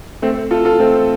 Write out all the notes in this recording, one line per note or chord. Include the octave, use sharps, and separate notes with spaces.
A3 C4
F4 A4
F4 A4
A3 C4